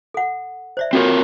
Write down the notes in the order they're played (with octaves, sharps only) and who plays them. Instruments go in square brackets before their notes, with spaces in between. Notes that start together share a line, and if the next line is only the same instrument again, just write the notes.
[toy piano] A4 F#5
C5 D5 E5
[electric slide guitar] C4 F4 A#4 [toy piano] F#4 A4 C#5